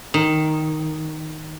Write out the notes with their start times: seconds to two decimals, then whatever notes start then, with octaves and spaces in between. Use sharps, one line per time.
0.14 D#3